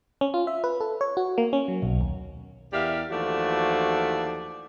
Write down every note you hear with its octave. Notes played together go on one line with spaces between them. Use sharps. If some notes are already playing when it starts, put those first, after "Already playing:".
C#4
F4
E5
B4
A4
C#5
F#4
A#3
C#4
F#3
B1
D#2
E2 G4 A#4 D5 E5 F5
D#2 E3 F3 A3 F#4 D5